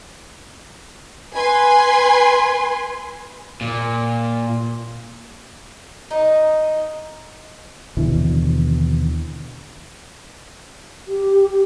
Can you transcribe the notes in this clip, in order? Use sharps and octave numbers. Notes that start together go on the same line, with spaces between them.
B4 G#5 C6
A#2
D#4
D#2 B2 D3 E3
G4